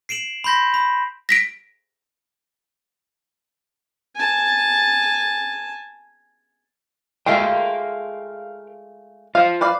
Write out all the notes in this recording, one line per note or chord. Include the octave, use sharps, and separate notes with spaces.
C7 D7 E7 F#7
B5 C6 G6 A#6 B6
B5
A#6 B6 D7
G#5 A5
G#3 A3 F4 A#4 F5 G5
F4 C5 F5
B4 D5 F5